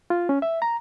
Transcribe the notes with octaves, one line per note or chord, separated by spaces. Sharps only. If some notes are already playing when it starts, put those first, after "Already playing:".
F4
C#4
E5
A#5